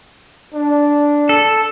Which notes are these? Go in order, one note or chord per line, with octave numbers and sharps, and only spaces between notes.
D4
A4